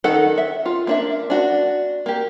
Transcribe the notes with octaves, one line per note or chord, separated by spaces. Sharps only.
D#3 D#4 A4 D#5 F#5
E5
F4
A#3 D4 E5
D4 F#4
A#3 G4